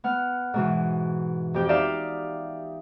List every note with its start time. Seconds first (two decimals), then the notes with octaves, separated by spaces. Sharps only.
0.04 B3 F#5 F6
0.54 G#2 B2 E3
1.54 F2 G4 G6
1.69 D#4 G4 D5 E5 F5